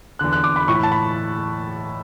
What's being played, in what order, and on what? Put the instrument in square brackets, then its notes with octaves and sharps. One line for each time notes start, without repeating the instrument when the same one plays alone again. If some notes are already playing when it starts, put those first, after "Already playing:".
[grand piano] E2 D3 F#6
F#6
D6
B5
A2 E3 C#6
B5
A5
B5